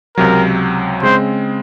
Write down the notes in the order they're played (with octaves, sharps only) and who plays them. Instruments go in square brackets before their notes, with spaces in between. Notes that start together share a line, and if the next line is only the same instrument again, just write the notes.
[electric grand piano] C#2 C3 F#3 [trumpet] A#4
[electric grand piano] C#3 G#3 C4 [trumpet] C5